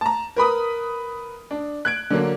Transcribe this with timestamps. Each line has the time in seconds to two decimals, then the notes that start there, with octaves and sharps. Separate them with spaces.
0.01 A5 A#5
0.36 A#4 B4 B5 D#6
1.51 D4
1.85 F#6 G#6 D7
2.10 D3 F#3 A#3 D4